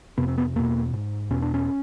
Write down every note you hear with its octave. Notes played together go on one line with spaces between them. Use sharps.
F2 C3 B3
C4
B3
E2 B2 A#3
G#2
E2 B2 C#4
D4
C#4